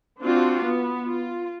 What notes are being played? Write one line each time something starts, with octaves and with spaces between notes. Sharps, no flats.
C4 D4 F4 F#4
B3
F4